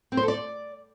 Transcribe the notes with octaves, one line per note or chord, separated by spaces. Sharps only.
C4
C5
A4
D5